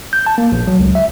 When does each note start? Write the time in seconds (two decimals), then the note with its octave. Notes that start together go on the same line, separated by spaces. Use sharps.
0.13 G6
0.26 A5
0.38 A#3
0.52 A#1
0.67 F#3
0.79 C#2
0.95 E5